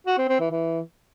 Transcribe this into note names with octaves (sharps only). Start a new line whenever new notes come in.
F#4
C4
C4
E3
E3